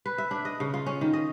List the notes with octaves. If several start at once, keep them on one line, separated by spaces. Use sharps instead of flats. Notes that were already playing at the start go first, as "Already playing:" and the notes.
B4
E5
D4
D#5
C#3
F4
C#4
D#3
D#5